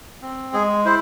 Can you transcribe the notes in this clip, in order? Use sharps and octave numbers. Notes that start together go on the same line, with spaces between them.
C4
G#3 G#4
E4 C5